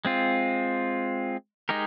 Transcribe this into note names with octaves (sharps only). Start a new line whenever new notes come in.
G#3 C4 F4
G#3 D#4 G4 A#4